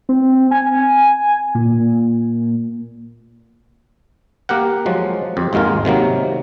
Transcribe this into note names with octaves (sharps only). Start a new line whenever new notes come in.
C4
G#5
A#2
A#3 G4 A#4 F#5
F3 F#3 G#3
F2 G4
G#1 D#2 G#3 F4 A#4
C3 D#3 F#3 A#3